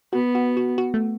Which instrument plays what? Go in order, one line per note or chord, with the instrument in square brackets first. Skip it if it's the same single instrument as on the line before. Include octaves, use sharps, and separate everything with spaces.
[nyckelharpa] B3 [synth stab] F#4
[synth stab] F#4
F#4
F#4
A3